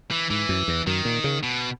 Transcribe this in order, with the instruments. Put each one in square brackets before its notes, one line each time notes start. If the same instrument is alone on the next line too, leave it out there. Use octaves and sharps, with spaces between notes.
[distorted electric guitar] E3
[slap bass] G#2 [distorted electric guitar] E3
[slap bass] F#2
E2
[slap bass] F#2 [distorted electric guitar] D#3
[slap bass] A#2
C#3
[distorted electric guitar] B2